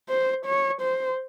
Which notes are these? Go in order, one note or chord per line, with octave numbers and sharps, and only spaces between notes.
C5
C#5
C5